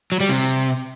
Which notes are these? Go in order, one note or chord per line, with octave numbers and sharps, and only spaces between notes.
F#3
G3
C3